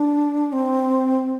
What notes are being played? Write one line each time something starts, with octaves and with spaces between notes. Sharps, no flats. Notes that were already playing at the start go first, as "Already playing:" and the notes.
Already playing: D4
C4